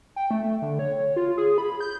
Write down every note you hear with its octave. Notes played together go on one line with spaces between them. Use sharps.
G5
A3
D3
C#5
F4
G#4
B5
G6